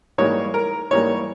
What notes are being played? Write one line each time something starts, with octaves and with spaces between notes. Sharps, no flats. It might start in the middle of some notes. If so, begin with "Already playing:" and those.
G#2 E3 G3 A#3 C#5
A#4
G#2 E3 G3 A#3 C#5